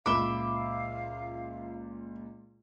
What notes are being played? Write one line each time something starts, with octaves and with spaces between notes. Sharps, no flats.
C#2 A#2 E5 F5 B5 D6 G7